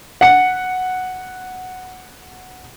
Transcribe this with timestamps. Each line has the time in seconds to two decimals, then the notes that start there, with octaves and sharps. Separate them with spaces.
0.21 F#5 C#7